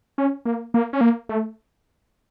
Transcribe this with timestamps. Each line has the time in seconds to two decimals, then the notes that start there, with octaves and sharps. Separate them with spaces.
0.18 C#4
0.46 A#3
0.74 A#3
0.93 C#4
1.01 A#3
1.29 A3